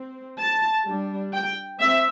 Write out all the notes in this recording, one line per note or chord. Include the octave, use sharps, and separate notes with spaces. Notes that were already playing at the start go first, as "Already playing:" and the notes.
Already playing: C4
A5
G3 D4
G5
C4 E5